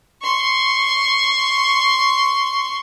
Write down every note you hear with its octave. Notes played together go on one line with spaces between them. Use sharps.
C6 C#6